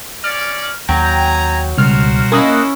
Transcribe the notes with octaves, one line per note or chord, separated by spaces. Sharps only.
C#4 D5 F6
D#2 F#3 G5 G#5 A#5
C#2 B2 G3 F#4 A#4 C5 F6
A#3 C#4 E4 D#5 F#6